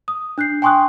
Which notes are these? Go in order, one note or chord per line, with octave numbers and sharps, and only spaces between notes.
D#6
D4 F#6 G6 C7
G5 G#5 C6 C#6 D#6 F#6